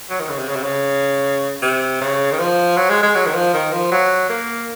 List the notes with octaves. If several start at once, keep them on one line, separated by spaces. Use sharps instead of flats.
F#3
D#3
C#3
C3
C#3
C3
C#3
C3
C#3
D#3
F3
F#3
G#3
G#3
F#3
D#3
F3
D#3
F3
F#3
A#3